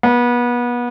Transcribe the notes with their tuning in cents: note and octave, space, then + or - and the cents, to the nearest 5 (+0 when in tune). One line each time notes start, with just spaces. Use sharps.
B3 -30